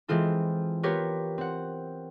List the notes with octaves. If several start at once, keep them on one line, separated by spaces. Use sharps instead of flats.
E3 G#3 C4 F4 A4
B3 F4 G4 A#4 B4 C#5
C4 F#5